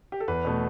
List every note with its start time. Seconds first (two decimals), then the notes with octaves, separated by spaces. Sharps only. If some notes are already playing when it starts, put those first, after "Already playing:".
0.12 G4
0.20 A4
0.28 E2 B4
0.45 B2 A3